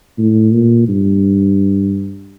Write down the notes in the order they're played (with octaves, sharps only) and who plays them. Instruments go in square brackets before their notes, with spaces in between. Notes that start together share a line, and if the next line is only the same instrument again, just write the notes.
[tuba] A2
A#2
G2